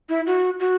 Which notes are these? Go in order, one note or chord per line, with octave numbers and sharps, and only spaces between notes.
E4
F#4
F#4